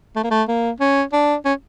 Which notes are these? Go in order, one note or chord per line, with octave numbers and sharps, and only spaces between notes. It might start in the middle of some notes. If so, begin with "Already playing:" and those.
A3
A#3
A3
A#3
C#4
D4
C#4